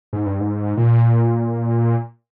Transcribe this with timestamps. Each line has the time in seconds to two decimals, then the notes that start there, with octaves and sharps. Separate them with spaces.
0.13 G#2
0.26 G2
0.40 G#2
0.77 A#2